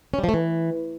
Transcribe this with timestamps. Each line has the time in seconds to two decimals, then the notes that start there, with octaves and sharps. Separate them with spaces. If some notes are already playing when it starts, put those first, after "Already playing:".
0.14 C#4
0.19 G3
0.24 F3
0.29 A3
0.34 E3